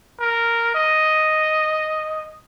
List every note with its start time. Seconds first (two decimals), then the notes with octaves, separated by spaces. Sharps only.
0.20 A#4
0.75 D#5